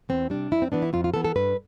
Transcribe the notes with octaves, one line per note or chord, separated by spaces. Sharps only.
E2 C4
C3 G3 D4
F2 E4
C4
E3 B3 D4
E4
F2 F4
F4
E3 B3 A4
A4
G2 B4